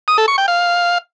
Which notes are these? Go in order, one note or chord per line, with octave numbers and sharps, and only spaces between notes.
D#6
A4
C#6
G5
F5